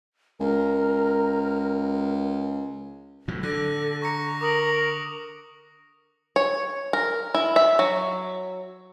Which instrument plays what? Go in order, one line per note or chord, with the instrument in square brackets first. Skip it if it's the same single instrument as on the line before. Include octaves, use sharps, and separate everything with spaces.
[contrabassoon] C#2 [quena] A#4
[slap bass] A2 F#3
[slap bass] D3 [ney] A4 [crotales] F#6 A#6
[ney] A#5 [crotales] C#6 A#6 C#7
[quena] A#4 [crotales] D6 D#6 F#7
[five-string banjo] C#5
A#4
E4
E5
F#3